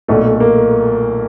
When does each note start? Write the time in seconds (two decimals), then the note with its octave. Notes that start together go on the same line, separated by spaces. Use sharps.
0.08 B1 A#2 A3
0.40 A#3